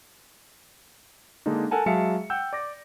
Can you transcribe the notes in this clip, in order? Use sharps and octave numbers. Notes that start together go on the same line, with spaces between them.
D3 G#3 A#3 D4 D#4
A4 A#4 F#5 G#5 A5
F#3 G#3 E5 F5 A5 C#7
F#5 G5 E6 G6
D5 D6 A#6